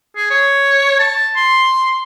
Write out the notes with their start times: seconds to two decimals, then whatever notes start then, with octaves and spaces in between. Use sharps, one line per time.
0.16 G#4
0.30 C#5
0.99 A5
1.36 C6